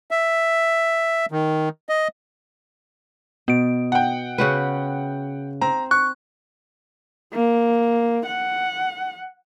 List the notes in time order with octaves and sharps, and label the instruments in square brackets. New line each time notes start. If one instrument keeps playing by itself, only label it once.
[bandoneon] E5
D#3
D#5
[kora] B2 [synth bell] B3 D7
[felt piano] F#5 G5
[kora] C#3 F#4 B4
[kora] C4 [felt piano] A#5
[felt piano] C#6 [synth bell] F#6
[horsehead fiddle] A#3
F#5